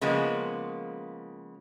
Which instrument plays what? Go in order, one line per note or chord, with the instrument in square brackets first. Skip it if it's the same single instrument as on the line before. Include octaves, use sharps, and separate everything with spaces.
[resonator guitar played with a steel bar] C#3 F3 G#3 A#3 B3